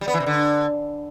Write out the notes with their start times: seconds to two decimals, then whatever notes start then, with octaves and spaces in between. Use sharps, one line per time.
0.01 G3
0.08 B3
0.14 E3
0.20 C3
0.26 D3